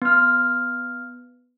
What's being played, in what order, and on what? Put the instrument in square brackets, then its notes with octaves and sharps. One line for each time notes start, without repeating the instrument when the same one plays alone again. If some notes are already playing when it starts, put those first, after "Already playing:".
[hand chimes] B3 F6